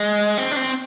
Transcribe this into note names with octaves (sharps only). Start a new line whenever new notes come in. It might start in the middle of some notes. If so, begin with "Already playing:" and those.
Already playing: G#3
C4
D4
C4